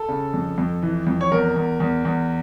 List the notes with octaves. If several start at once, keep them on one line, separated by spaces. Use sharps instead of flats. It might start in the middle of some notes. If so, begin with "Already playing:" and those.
Already playing: A4
C#3
F2
F2
E3
F2
C#5
E2 A#4
E2
E2
E2